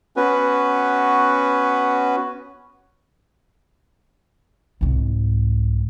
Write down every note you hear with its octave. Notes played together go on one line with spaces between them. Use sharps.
B3 C#4 F#4 B4
C2 G#2